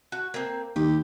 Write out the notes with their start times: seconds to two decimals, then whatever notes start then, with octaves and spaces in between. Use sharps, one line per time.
0.12 F#4
0.34 A#3 C4
0.76 D#2 G4